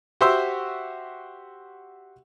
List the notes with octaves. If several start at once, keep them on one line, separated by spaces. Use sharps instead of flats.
F#4 G4 C5 E5 C6 E6